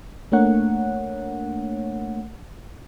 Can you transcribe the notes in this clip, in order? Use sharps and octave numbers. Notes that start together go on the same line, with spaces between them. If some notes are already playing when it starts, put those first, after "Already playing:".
A3 A#3 D4 A#4 C#5 F#5